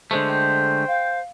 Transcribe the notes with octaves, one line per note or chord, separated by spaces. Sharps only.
D3 G#3 A3 C5
G5
F5